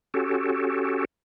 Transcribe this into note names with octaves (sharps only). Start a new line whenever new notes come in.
C#4 F#4 G4 A4